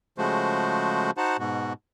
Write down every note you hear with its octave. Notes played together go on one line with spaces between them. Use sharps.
C#3 F3 G#3 A3 F#4 C5
D#4 F#4 C5 F#5 A5
G#2 B2 F#4